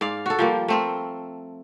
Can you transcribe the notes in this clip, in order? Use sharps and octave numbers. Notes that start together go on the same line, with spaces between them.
G#2 D5 F5
F#4 A4
F3 G3 A#3
A3 C4 A#4